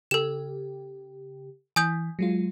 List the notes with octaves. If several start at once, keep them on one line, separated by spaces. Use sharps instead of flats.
C#3 G4 A4 E7
E3 G#5 D#6 G6
F#3 G#3 F4